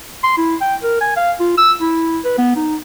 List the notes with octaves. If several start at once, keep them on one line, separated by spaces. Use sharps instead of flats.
C6
E4
G5
A#4
G#5
F5
F4
E6
E4
B4
B3
D#4